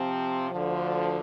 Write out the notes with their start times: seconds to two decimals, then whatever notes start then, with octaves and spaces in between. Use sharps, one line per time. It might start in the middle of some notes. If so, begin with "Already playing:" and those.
Already playing: C3 F3 C4
0.51 D2 D3 F3